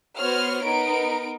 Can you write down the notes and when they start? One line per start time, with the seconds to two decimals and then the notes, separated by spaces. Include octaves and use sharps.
0.18 B3 F#4 C5 C#5 F6
0.64 B3 D#4 A#4 D7